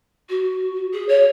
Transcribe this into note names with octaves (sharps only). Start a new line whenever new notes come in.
F#4
G#4
C#5